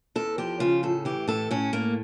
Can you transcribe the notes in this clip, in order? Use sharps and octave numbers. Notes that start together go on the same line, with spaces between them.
E2 A4
F3 G4
C#3 F4
A2 A4
E3 G4
A2 A4
A2 C#4
A2 A#3